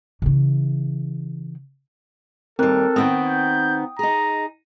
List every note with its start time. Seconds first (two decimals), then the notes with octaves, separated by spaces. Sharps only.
0.22 C#3 E3
2.59 D#2 G3 C4 A4 A#4 F#6
2.96 D#3 B3 C4 G5 D#6
3.27 G6
3.99 D#4 G#4 A#5